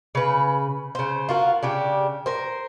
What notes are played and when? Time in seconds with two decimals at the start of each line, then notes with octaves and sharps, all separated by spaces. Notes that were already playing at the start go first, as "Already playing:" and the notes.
0.15 C#3 B4
0.95 C#3 C5
1.29 F4 F#4 A#4
1.63 C#3 D4 G4
2.26 A#4 C5